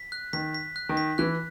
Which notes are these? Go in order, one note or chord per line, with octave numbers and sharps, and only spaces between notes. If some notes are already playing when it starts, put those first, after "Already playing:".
Already playing: B6
F#6
D#3 B6
B6
F#6
D#3
B6
E3 F#6